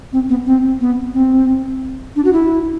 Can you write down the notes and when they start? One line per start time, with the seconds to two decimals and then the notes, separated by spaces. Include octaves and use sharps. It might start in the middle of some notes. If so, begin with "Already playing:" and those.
0.13 C4
0.29 B3
0.46 C4
0.81 B3
1.14 C4
2.16 D4
2.25 F#4
2.33 E4